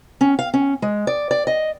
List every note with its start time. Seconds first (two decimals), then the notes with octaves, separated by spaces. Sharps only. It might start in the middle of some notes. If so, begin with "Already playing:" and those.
0.21 C#4
0.39 F5
0.54 C#4
0.82 G#3
1.07 D5
1.31 D5
1.47 D#5